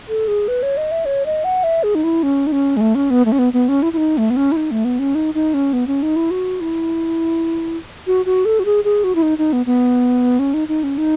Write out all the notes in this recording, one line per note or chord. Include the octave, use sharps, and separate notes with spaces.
A4
G#4
B4
C#5
D#5
E5
C#5
D#5
F#5
E5
G#4
D#4
E4
C#4
D#4
C#4
G#3
A3
C#4
B3
A3
C#4
B3
B3
C#4
E4
E4
D#4
A3
B3
C#4
E4
D#4
A3
B3
C#4
D#4
D#4
C#4
B3
C#4
D#4
E4
F#4
E4
F#4
F#4
A4
F#4
G#4
G#4
F#4
E4
D#4
D#4
B3
B3
C#4
D#4
D#4
C#4
D#4